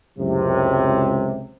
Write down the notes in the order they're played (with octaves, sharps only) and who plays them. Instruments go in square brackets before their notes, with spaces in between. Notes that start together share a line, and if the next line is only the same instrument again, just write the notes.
[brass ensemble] C#2 F#2 A2 C3